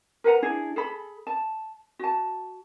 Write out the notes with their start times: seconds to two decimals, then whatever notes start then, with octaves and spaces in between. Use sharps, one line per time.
0.24 A#4 B4 F#5 A#5
0.42 D4 E4 G#4
0.76 G#4 A4 B5
1.27 A5
1.99 F#4 A5